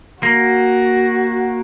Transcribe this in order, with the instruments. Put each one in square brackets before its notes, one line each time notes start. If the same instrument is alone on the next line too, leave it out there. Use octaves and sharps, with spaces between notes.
[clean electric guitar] A#3 [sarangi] F#4